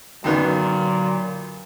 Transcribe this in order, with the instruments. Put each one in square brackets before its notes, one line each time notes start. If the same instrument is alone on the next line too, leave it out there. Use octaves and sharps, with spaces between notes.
[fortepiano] F#2 D#3 B3 [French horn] A#2 [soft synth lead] D3 [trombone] F#3